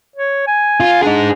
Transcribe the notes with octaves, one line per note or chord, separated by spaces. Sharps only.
C#5
G#5
F4
D4 D#4 G#4